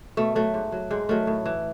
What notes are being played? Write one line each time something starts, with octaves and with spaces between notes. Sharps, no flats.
B2 A3
F#3 A3
G#2
F#3
G#2 G#3
D#3 F#3 A3
A2
E3